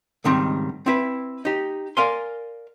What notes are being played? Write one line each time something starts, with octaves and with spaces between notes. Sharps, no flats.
C#2 G#2 D#3 G3 C4
C4 E4 B4
D#4 G4
A#4 D5 F5 G#5 C6